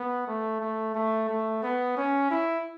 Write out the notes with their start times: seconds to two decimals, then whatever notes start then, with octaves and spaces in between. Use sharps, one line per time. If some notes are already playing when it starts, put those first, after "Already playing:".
Already playing: B3
0.27 A3
0.61 A3
0.95 A3
1.30 A3
1.63 B3
1.97 C#4
2.31 E4